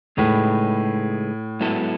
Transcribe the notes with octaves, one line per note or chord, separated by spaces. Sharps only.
A2 C#3 G#3 D#4 G#4 B4
G#2 F#3 B3 E4 A4